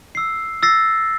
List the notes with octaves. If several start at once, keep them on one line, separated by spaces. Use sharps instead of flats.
E6 C7
E6 A6 A#6 C7